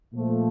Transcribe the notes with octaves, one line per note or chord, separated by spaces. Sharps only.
A#2 F3 A3